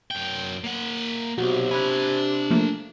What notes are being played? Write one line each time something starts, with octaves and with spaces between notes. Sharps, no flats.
F#2 G5
A#3 F#5
B1 C3 F#4
D4 G#5 B5 F#6
F3 A3 A#3